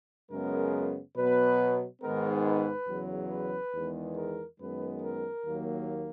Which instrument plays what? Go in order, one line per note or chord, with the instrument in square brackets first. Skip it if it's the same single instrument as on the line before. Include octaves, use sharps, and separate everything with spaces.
[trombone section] F#2 C#3 G#3 B3 A#4
B2 F#3 B3 B4
G#2 D#3 G#3 B3 A#4
B4
E2 C#3 F#3
B4
E2 D#3 G#3 B3
A#4
F#2 D#3 G#3 B3 B4
A#4
D#2 D#3 F#3 A#3